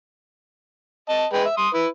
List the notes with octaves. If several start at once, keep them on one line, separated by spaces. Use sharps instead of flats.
D#5 A5
G#3 B4 G5
E5
C6 D#6
E4 B4